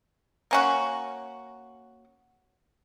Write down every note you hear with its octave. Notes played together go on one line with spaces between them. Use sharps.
A#3 C#4 F#4